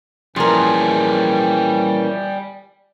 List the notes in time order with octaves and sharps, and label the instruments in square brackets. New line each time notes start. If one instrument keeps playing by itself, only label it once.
[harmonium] A#2 E3 C#4 [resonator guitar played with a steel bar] F3 A#4 [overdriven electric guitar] G3 G#4